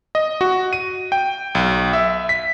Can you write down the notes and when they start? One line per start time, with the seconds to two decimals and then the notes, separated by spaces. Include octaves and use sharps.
0.15 D#5
0.41 F#4
0.73 D#7
1.12 G5
1.55 B1
1.93 E5
2.29 B6